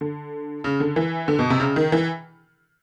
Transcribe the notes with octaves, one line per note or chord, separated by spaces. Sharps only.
D3
C#3
D3
E3
D3
B2
C3
C#3
D#3
E3